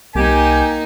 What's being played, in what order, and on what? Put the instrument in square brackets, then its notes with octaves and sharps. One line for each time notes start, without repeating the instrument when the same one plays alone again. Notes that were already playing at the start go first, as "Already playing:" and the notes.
[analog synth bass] C2 [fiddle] A#3 D#4 [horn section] G4 G#5